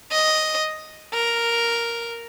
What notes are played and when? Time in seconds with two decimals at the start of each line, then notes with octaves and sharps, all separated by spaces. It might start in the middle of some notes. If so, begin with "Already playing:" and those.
0.12 D#5
1.14 A#4